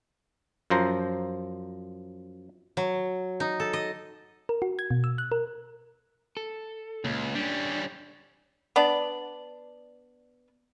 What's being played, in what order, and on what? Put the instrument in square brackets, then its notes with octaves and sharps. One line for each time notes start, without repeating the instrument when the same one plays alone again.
[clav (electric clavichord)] F#2 F3 C5 A#5
[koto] F#3
D#4
A4
D#5
[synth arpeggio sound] A#4
F#4
G#6
B2
E6
F#6
A#4
[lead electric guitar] A4
[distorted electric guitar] C#2 [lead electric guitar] A#2
[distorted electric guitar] G3 C#4 [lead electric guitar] D4
[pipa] B3 D4 D5